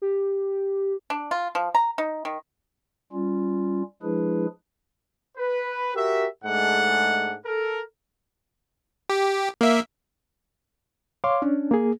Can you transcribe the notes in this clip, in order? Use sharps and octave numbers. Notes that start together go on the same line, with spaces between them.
G4
D4
F4
F3
A#5
D#4
D#3
G3 C#4 F4
F3 G#3 D4 E4 G#4 B4
B4
F#4 G4 A#4 E5
G#2 G#3 A3 D4 F#5
A4 A#4
G4
A#3 E5
C#5 F5 C6 D6
C#4 D4
A#3 G#4